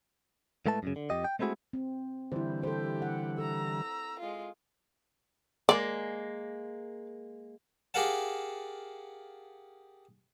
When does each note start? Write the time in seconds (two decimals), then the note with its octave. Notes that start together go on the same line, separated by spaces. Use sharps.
0.66 A2 G#3 A3 B4 A5
0.83 F#2 A2 C#3
0.96 D3
1.10 F2 G4 D#5
1.24 G5
1.39 G#3 A3 C4 E4 F#4 G#4
1.73 C4
2.32 D3 E3 G3 E4 C5
2.63 G4 A4 C5
3.02 F#5
3.38 A4 A#5 E6
4.20 G#3 F4
5.69 G#3 A#3 D5
7.94 G4 G#4 A#4 F5 F#5 A5